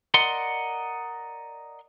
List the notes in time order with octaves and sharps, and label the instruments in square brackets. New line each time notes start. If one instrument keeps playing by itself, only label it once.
[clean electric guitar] A#4 D5 D#5 F#5 C6